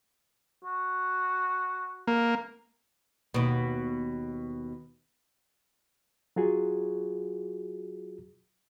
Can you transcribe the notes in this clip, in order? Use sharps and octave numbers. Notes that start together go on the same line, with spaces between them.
F#4
A#3
D#2 B2
F#3 F4 F#4 G#4